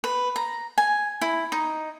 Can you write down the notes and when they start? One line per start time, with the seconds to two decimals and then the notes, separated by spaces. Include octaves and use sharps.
0.04 B4
0.36 A#5
0.78 G#5
1.21 E4
1.52 D#4